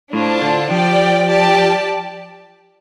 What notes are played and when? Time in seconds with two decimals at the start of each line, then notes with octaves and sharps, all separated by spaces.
0.13 A2 D4 F4 C5 A5
0.41 D3
0.71 F3 G4 D5 G5
1.27 G4 D5 A5